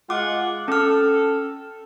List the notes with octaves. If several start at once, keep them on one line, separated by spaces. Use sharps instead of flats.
G#3 F4 F#5 D6
C#4 A4 F6